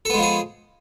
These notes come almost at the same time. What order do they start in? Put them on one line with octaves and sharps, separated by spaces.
A4 B3 G#3 F3 G#4